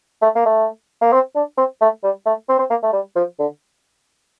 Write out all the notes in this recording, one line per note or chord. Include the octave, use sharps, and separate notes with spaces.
A3
A#3
A3
A#3
C4
D4
C4
A3
G3
A3
C4
C4
A#3
A3
G3
F3
D3